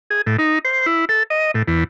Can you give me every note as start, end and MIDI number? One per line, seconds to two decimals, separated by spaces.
0.10 0.22 68
0.26 0.37 45
0.39 0.59 63
0.65 0.86 72
0.86 1.05 64
1.09 1.23 69
1.30 1.51 75
1.54 1.63 45
1.68 1.84 40